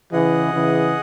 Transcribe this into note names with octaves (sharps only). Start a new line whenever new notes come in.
C#3 E3 G#4 D#5 F#5
C#3 E3